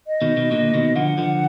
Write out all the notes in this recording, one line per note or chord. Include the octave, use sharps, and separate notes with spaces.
D#5
B2 D#3
B2 D#3
A#2 D3
B2 D#3
D3 F3 F#5
D3 F3